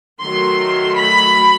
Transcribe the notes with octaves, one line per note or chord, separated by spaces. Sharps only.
D#3 F#3 A3 C6
B5